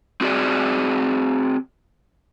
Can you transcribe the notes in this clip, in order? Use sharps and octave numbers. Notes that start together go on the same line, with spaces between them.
C4 F#4 G#4 D5